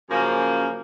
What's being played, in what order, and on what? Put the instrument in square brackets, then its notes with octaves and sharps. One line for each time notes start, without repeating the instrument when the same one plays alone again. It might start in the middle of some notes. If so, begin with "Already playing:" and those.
[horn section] F#2 C#3 F3 A#3